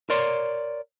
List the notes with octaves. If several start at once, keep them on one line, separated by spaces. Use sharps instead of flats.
A#4 C#5 D5 C6